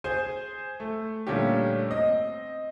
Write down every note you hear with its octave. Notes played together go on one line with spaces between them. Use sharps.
G#4 C5 G#5 G6
A3
A#2 D3 G3 A3 C#4 G4
C4 D#5